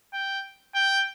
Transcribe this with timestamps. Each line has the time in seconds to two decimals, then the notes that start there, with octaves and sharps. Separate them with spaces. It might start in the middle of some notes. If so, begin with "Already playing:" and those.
0.13 G5
0.75 G5